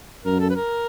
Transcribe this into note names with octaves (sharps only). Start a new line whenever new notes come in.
F#2 A#4
A4
B4
A#4